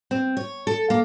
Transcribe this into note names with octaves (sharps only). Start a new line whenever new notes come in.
C4
C#5
A4
A#3